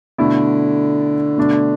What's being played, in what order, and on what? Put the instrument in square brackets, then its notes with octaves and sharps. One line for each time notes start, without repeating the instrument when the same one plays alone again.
[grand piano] B2 A3 E4 [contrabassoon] D3
[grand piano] B2 A3 D4